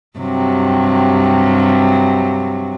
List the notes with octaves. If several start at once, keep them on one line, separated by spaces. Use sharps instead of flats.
G2 C3 F#3